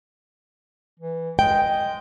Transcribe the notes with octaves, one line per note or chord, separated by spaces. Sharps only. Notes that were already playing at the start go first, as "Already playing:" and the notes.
E3
G#3 G5